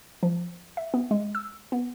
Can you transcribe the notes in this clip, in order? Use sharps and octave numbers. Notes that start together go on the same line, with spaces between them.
F3
E5
B3
G#3
E6
B3